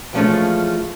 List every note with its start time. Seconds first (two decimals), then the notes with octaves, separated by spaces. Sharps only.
0.13 E3 F3 G#3 A3 C#4 F4